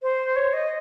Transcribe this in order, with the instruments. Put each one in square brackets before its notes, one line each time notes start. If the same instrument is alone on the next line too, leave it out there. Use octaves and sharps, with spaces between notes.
[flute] C5
C#5
D#5